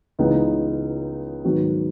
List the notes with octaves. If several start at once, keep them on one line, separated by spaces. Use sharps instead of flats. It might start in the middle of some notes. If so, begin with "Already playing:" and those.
C#2 C#3 E3 B3 D#4
G#2 D#3 F#3 B3 F#4